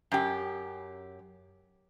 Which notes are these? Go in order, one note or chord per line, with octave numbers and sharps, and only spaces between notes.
F#2 G4